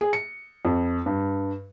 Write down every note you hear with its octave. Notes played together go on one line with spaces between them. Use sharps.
G#4
C#7
F2
G2